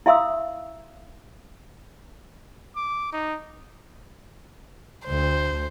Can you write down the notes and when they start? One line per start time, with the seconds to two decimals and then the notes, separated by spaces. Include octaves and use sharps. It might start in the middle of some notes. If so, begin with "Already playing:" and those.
0.06 E4 E5 F5 C6 D#6 E6
2.76 D6
3.12 D#4
5.06 D2 C5